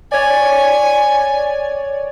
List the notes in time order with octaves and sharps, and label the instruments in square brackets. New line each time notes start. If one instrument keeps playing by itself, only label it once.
[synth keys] C#5 D5 [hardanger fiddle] G#5